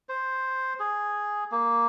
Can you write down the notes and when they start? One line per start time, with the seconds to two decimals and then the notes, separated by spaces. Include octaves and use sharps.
0.09 C5
0.80 G#4
1.51 A#3